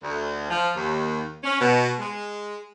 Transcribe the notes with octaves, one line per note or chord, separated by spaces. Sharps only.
D2
F3
D#2
C#4
B2
G#3